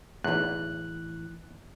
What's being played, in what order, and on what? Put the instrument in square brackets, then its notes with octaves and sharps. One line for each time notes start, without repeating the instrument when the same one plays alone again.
[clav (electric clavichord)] B1 E2 [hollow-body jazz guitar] A2 E3 [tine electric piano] F#6